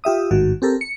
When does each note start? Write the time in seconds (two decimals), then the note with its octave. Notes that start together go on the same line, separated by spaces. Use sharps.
0.04 F4 G4 E5 D#6
0.31 A1 G#2 D#3 F#4
0.62 C4 G4 A4 A#4
0.81 C#7